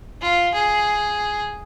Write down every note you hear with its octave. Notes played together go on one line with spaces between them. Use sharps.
F4
G#4